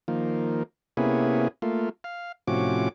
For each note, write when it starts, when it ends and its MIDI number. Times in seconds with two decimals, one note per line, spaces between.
0.08 0.63 51
0.08 0.63 53
0.08 0.63 58
0.97 1.48 48
0.97 1.48 58
0.97 1.48 59
0.97 1.48 61
0.97 1.48 64
0.97 1.48 68
1.62 1.89 57
1.62 1.89 58
1.62 1.89 65
2.04 2.32 77
2.47 2.89 45
2.47 2.89 48
2.47 2.89 53
2.47 2.89 61
2.47 2.89 66
2.47 2.89 86